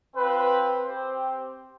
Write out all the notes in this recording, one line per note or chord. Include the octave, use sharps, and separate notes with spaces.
C4 F4 B4
C4 G4 C5
C5